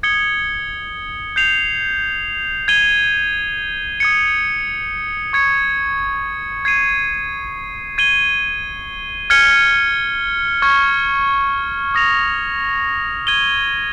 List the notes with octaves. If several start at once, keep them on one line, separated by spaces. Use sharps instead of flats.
D#6 G#6 C#7 G7
G6 C7 F7
G#6 D#7 G7
D#6 G#6 C#7
C#6 G#6 C#7
G#6 C7 D#7
G#6 D#7 G7
F6 G#6 C#7 G7
C#6 F6 G#6
D#6 A#6 F7
G#6 D#7 G7